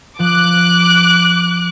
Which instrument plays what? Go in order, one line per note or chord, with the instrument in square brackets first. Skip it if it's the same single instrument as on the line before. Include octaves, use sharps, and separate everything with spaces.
[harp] F3 [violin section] D6 F#6